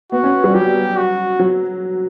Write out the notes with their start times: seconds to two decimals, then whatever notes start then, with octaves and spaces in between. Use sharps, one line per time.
0.12 B3 F#4
0.23 C#4
0.44 G3
0.54 F#3 G4
0.97 F#4
1.39 F#3